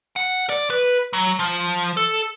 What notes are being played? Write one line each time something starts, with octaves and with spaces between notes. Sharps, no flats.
F#5
D5
B4
F#3
F3
A4